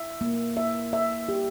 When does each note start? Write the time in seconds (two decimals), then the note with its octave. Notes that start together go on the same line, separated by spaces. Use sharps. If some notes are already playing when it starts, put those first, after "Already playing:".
Already playing: E5
0.21 A#3
0.57 E5
0.93 E5
1.29 G4